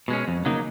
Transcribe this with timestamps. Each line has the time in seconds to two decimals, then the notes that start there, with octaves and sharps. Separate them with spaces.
0.08 B2 G#3 C#4
0.28 F2
0.45 C#3 F#3 A#3 D#4